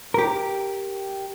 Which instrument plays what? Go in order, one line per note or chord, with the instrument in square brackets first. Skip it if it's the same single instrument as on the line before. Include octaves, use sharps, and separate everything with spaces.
[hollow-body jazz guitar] G4 A#4